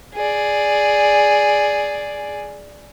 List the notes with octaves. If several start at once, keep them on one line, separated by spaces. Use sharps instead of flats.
G#4 D5